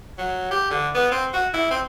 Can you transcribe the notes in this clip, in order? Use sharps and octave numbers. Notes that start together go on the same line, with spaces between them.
F#3
G4
D3
B3
C4
F#4
E4
C4